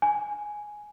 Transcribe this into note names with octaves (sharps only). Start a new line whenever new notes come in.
G#5